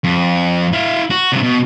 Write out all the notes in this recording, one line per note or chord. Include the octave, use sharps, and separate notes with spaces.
F2
E4 F5
F#4
G2 C3
B2